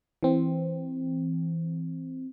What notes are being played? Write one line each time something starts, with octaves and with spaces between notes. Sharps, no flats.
E3 C4